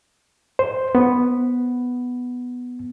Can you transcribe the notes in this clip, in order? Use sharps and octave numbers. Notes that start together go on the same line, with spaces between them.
C5
B3